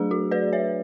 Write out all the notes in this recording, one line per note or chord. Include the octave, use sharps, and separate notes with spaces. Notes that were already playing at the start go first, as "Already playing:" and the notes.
Already playing: F#3 A3 D4 G#4
F#4
B4 D5
C#5 E5